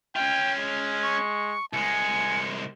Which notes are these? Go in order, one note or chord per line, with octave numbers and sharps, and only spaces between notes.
C#4 F4 G5
G#3
C#6
C2 G#3 G#5 C#7